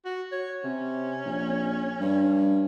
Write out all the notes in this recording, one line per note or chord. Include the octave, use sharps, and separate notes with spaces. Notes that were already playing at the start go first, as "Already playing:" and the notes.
F#4
C#5
C3 C#4
A#1
G2